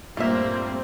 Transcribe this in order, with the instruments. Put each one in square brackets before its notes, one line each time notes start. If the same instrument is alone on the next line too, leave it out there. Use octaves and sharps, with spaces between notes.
[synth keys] G2 A#2 A3 [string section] G3 C4 [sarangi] A#3 [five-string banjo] F4 E5